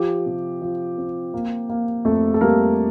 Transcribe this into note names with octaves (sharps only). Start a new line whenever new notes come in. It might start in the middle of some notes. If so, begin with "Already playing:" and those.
Already playing: F3 G4
C3
F3
C4
A#3
A#3
F2 A3 A4
A4
G3 A#3 A#4